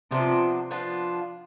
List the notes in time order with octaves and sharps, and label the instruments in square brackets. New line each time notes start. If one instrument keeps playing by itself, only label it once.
[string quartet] C3 [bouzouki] F3 B3 D4 F4
[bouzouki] F3 B3 D4 F4